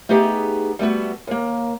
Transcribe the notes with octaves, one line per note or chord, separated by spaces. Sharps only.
A3 B3 D#4 G4 G#4
G3 A3 B3 F#4
D#2 A#3